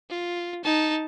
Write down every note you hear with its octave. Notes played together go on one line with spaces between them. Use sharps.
F4
D#4 A5